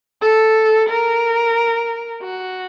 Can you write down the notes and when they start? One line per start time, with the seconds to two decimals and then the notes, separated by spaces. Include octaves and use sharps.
0.21 A4
0.89 A#4
2.23 F#4